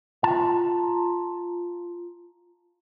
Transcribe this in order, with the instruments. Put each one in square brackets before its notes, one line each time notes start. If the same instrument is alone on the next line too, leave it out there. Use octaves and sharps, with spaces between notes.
[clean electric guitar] F4 A5 A#5